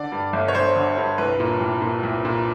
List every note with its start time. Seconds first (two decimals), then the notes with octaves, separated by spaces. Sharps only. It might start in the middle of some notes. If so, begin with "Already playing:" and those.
Already playing: D3 D5
0.12 G2
0.33 G1
0.48 C#5
0.55 G1 C5
0.76 D3
0.98 G2
1.18 C2 B4
1.40 A#2
1.61 C2
1.82 A#2
2.03 C2
2.25 A#2